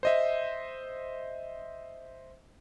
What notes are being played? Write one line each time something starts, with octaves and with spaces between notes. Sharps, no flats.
C5 D#5 E5